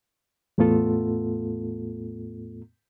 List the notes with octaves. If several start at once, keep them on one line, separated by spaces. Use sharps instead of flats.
E2 A2 A3 B3 F4 A4